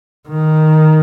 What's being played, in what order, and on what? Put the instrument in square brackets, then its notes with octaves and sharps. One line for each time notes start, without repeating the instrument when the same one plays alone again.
[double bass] D#3